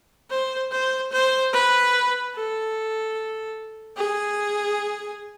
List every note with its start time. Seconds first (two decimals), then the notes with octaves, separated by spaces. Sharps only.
0.30 C5
0.71 C5
1.12 C5
1.53 B4
2.34 A4
3.97 G#4